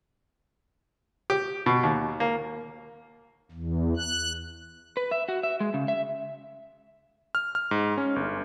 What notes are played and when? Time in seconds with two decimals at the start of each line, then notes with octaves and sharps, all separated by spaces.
1.30 G4
1.66 B2
1.83 D#2
2.20 A#3
3.52 E2
3.97 F#6
4.97 B4
5.11 E5
5.28 F#4
5.43 E5
5.60 G#3
5.74 C#3
5.88 E5
7.35 F6
7.55 F6
7.71 G#2
7.98 C#4
8.16 G1